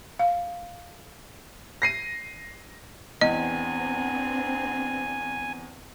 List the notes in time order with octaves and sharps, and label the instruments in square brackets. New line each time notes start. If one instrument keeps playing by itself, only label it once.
[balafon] F5
[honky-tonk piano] A#6 C7 D#7
[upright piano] E2 [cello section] B3 C4 D4 [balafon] D#5 [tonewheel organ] G#5